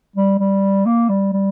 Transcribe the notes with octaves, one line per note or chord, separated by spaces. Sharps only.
G3
G3
A#3
G3
G3